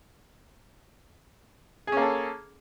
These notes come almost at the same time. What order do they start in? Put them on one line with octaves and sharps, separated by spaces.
G#4 C#4 A#3 A4